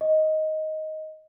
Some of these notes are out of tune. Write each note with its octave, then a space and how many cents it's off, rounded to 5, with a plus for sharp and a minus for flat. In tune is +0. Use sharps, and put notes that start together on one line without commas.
D#5 +5